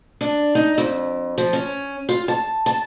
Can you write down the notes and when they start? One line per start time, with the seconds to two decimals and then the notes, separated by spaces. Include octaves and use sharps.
0.21 D4
0.55 D#4
0.78 F2
1.38 F3
1.53 C#4
2.09 F4
2.28 A5
2.66 A5